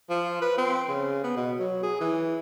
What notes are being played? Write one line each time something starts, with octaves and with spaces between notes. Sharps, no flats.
F3
B4
C4
C#3
B3
B2
F#3
G#4
E3